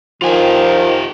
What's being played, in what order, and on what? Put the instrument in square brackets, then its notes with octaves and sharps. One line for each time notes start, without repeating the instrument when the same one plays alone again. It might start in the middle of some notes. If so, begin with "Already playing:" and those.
[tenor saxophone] D#3 [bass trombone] F3 [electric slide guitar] F4 G4 G#5